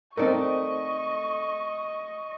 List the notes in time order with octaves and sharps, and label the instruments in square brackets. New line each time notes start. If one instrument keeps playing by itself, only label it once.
[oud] A3 D5 [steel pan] C4 D#4 A#4 [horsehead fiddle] D#5 [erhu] C#6